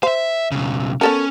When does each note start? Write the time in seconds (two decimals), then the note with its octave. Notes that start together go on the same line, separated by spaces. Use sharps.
0.03 C5 E5 F5
0.52 B1 C#3
1.01 B3 C#4 A4 A#4